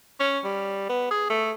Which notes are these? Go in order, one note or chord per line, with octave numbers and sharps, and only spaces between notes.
C#4
G3
B3
G#4
A3